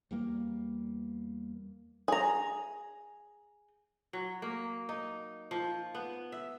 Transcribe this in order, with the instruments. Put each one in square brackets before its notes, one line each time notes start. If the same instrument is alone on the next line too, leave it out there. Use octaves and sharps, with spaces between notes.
[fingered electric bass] E2 G3 A#3
[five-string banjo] G#4 A#5
[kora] F#3
A#3
D#4
F3
B3
E5